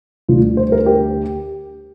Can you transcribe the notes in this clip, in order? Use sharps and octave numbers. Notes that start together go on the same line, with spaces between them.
D2 D3 G3 F4
C5
A#4
G4